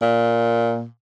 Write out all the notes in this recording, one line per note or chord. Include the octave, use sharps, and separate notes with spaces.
A#2